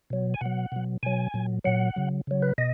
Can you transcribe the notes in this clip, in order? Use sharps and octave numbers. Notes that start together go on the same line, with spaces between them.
B2 F#3
G#5
B2 F#3 F#5
B2 F#3
B2 F#3 G#5
A#2 F#3
A#2 F#3 F#5
C#3 F#3
C#3 F#3
B4
B2 D#5